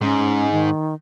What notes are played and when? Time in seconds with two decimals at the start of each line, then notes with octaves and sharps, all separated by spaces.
0.02 G#2 C#4
0.52 D#3